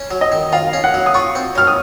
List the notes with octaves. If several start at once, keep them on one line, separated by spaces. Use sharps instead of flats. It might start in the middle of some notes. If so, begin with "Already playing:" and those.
Already playing: C#4
F#3
D#5
D#3
F4 F5
C#4
F#5
F#3
D#6
F4 C#6
C4
F#3 F6
D#6